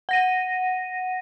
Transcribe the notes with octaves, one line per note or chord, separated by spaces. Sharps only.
F#5 A#6 D#7